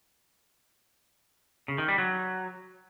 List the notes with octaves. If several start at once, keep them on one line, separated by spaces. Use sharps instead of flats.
C#3
D#3
G3
F#3